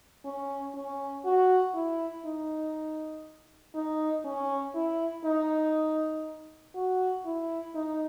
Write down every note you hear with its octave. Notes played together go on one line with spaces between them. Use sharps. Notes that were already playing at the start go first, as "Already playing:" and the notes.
C#4
C#4
F#4
E4
D#4
D#4
C#4
E4
D#4
F#4
E4
D#4